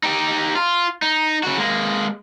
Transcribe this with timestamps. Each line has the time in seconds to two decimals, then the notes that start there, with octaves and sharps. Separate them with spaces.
0.03 D#4 G4
0.56 F4
1.02 D#4
1.43 C#3 F#4
1.58 G#3 A#3